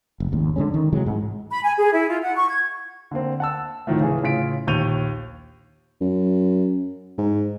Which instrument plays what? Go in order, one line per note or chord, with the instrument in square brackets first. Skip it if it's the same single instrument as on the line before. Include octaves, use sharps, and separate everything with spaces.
[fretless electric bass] F1
G#1 D#2
D3 F#3 G#3 C#4
D#3
C3 E3 F#3 G#3
G#2
[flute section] B5
G#5
G#4
E4
F4
F#5
C#6
G#6
[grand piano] D3 A#3 C4
F#5 A5 E6
D2 A2 D#3 F3 A3
C#3 E3 G#4
A2 C#3 F4 B6 D7
A#1 D#2 C#6 G6 D#7 F7
[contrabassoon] F#2
G#2